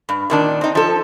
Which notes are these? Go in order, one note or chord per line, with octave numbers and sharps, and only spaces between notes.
G2
A#2 D#3 D4
C4 D#4
F3 A4